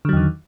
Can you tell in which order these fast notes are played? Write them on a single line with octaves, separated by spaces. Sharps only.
D3 F#3 E2 D#3